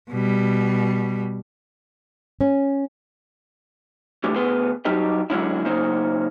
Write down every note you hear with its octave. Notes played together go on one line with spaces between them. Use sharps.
B2 G3
C#4
D3 E3 A3 G4
D2 B3 G#4 B4 C6
F#3 G3 D#4 G4 D#5
D3 F#3 G#3 C#4 D4 E4
C#3 F#3 A#3 C#4 D#4 C5